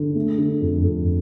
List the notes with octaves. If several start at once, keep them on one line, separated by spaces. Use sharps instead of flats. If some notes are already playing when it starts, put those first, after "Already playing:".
Already playing: D3
A3
D3
F2
F2